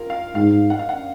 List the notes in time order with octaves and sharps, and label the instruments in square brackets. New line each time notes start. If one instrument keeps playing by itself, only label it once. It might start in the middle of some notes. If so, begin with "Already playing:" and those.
Already playing: [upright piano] F4 A#4
F5
[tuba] G#2 [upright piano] F5
[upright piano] F#5
F5
F#5